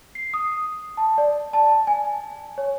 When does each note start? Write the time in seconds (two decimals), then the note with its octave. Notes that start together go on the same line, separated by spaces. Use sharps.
0.15 C7
0.34 D#6
0.97 A5
1.18 D5
1.53 A5
1.87 G#5
2.58 C#5